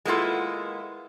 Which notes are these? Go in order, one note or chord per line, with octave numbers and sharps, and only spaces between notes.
G#3 A#3 B3 E4 F4 A4